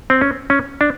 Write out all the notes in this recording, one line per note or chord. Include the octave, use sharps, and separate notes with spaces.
C4
C#4
C#4
D4